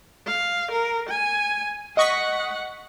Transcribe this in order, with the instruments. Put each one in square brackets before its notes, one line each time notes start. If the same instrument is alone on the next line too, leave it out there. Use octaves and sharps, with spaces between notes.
[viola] F5
A#4
G#5
[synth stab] D#5 C#6 B6 [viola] F#5